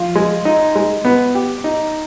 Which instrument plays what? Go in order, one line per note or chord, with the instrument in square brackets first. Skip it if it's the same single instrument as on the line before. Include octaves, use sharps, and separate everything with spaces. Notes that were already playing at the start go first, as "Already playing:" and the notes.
Already playing: [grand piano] F3 [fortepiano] F4
[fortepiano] G#3
D#4
G#3
B3
G4
D#4